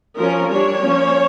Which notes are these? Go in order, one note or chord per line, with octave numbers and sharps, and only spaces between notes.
F3 C#4 A#4
G3 D4 C#5
F3 A#3 C#4